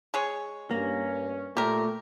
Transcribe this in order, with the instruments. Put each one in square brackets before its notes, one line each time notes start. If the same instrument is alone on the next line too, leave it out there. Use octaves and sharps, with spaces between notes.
[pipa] G#3 G#4 C#5
[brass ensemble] G2 C#4 [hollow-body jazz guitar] A#3
[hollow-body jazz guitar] A#2 [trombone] A3 [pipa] G4 A#4